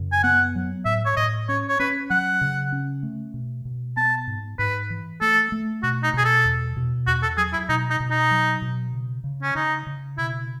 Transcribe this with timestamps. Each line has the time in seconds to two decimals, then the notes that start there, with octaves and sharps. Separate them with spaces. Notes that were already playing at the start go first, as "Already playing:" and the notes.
Already playing: F#2 C#3
0.12 G#5
0.24 B3 F#5
0.55 F#3
0.85 A2 E5
1.05 C#5
1.17 A2 D#5
1.49 C#4 C#5
1.69 C#5
1.80 C#4 B4
2.10 F#3 F#5
2.41 C#3
2.72 C#4
3.03 A3
3.34 B2
3.65 B2
3.97 B3 A5
4.27 G#2
4.58 G#2 B4
4.90 E3
5.21 A3 A4
5.52 A3
5.83 B2 F#4
6.03 D#4
6.14 B2 G#4
6.24 A4
6.45 E2
6.76 B2
7.07 E2 F#4
7.23 A4
7.37 F#3 G#4
7.53 E4
7.69 B2 D#4
7.90 D#4
8.00 B2
8.11 D#4
8.31 F#3
8.62 B2
8.93 C#3
9.24 C#3
9.43 C#4
9.55 C#3 D#4
9.87 C#3
10.18 B2 E4